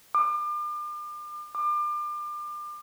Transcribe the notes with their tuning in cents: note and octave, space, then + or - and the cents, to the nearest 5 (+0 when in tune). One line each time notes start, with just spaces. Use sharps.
D6 +40
D6 +35